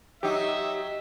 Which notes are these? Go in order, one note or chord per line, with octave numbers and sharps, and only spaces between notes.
F#3 D#4 G4 E5